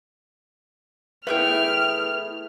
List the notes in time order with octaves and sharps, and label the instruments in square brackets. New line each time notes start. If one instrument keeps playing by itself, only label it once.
[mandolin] A3 E5 G5 [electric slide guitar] E4 G#4 B4 [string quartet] F6